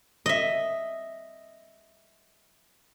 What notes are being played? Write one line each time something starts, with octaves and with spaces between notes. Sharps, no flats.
D#5 E5